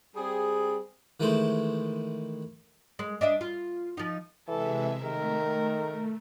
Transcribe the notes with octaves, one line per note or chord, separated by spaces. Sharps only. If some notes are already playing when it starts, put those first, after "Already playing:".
G3 C4 G#4
D#3 E3 G#3 A3 C5
G#3
D4 D#5 E5
F4
F3 D#4
C3 E3 G#3 A4 E5
D#3 A3 A#4